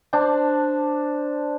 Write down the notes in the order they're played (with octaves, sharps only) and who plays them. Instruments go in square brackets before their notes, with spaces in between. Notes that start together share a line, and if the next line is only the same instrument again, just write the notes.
[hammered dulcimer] D4 C5 A5